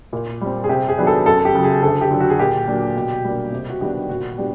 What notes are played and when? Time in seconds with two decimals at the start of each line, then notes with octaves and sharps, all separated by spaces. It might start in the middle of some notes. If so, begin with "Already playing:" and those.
0.13 A#2
0.41 G3 C4
0.64 G#4
0.69 C3 G4
0.89 G#4
0.98 D#3 F#3 B3 D4
1.07 A4
1.26 F#2 A4
1.45 G4
1.54 C#3 F#3
1.64 G#4
1.83 D2 A4
2.01 G4
2.11 D3 F#3
2.21 F#4
2.30 G#4
2.39 A#2 G4
2.68 F#3 A#3 D4
2.96 B2
3.24 G3 A#3 D4
3.52 C3
3.70 F#4
3.81 D#3 G3 B3 D4 G4
4.09 A#2 F#4
4.38 G3 B3 D4 G4